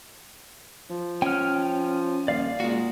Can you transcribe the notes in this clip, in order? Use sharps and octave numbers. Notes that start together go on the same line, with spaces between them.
F3
C#4 G5 F6
D#1 D5 F5
A#2 G#3 F#4